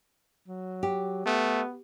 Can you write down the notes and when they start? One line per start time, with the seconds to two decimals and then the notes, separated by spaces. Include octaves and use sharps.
0.48 F#3
0.83 G4
1.26 A3 B3